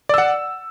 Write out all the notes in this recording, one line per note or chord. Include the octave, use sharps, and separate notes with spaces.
D5 F#5 E6